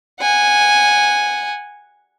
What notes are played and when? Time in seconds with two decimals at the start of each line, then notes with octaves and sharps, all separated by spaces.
0.21 F#5 G#5